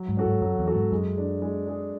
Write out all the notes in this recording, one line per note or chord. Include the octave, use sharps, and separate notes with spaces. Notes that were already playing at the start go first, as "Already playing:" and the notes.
Already playing: F#3
G#2
C#4 F#4 A4
G#2
F#2 F#3
E2
C#4 F#4 A4
G#2
F#2 G#3
D4 G#4
G#3
D4 G#4